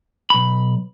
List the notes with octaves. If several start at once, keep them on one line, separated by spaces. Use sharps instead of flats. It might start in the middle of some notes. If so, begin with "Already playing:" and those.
B1 B5